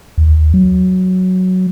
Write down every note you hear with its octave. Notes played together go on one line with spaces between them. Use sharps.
D#2
F#3